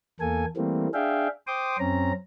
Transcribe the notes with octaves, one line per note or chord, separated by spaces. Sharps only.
E2 A#3 A4 G#5
E3 G3 A3 A#3 C4
D4 G#4 E5 F5 G5
C5 G5 C6 D6 D#6
F#2 C4 C#4 A#5